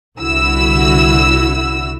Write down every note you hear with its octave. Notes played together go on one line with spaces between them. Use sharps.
C2 D3 E4 F#4 E6